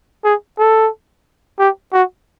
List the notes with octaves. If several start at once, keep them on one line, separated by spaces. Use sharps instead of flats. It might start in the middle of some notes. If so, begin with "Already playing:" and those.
G#4
A4
G4
F#4